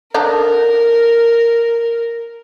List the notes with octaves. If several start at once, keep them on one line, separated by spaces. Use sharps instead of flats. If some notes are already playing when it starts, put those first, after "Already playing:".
D3 D4 D#4 A#4